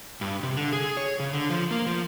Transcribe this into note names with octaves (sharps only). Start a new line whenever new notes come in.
G2
C3
D3
G#4
C#5
C#3
D3
F3
A#3
F3